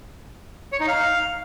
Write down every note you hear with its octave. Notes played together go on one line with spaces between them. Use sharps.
C#5
D#4
F5